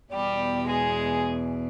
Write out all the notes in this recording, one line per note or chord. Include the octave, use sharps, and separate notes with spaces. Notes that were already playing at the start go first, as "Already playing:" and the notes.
E2 B2 G3 G4
G#3 G#4